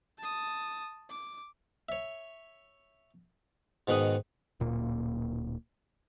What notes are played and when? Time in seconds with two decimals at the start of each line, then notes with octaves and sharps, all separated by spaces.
0.19 A5 D#6
1.10 D6
1.89 C#5 E5
3.87 G#2 B2 D#3 F#5 D#6
4.60 D1 A#2 A#3